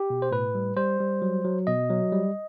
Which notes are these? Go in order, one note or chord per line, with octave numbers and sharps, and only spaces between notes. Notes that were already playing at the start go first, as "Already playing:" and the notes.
Already playing: G4
B2
C5
A2 B4
G3
G3 C5
G3
F#3
F#3
B2 D#5
F#3
G3